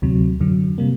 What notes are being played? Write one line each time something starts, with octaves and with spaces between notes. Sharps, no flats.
D2 C3 F#3
F#2 D3 F#3
C3 G3 A#3